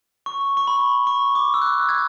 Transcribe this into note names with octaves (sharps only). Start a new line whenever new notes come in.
C#6
C#6
B5
C#6
D6
E6
F#6
F#6
G#6